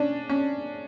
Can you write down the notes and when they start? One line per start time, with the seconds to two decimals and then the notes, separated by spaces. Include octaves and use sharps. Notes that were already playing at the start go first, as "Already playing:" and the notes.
Already playing: C#4 D4
0.29 C#4